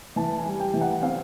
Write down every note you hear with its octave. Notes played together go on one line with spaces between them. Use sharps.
E3 A5
G#5
G3
G5
E3
F#5
C4 F5